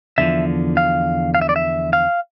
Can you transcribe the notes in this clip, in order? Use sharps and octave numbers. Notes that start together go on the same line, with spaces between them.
E2 D3 F3 E5
F5
F5
E5
D5
E5
F5